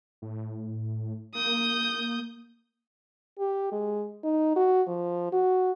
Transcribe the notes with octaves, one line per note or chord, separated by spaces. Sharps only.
A2
A#3 D#6 G6
G4
G#3
D#4
F#4
F3
F#4